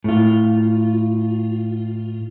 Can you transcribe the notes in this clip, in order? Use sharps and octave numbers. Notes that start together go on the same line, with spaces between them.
A2 F4